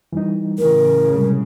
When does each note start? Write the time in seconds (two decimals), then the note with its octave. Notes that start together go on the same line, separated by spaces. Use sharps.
0.13 E3 G3 D#4
0.58 A2 C#3 E3 A3 A#4
1.14 C3 G3 G#3